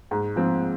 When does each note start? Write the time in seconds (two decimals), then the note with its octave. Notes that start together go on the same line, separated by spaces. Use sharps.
0.11 G#2
0.36 F3 C4